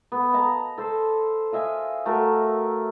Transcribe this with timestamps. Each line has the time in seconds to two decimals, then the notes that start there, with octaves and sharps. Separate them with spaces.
0.12 B3
0.34 D#5 A5 A#5
0.78 A4 C5
1.52 F4 D#5 E5 G#5
2.06 A3 F#4 A#4